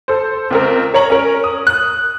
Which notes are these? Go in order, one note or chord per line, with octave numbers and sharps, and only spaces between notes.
A4 C5
C#2 C4 A#4
A#4 C#5 A#5 F#7
C#4 A#4
D#6
F#6